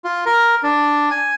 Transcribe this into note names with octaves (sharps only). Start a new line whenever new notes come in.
F4
A#4
D4
G#5